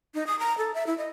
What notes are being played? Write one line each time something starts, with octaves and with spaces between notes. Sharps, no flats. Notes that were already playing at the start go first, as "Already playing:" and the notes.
D#4
D#6
A#5
A4
E5
E4
D#5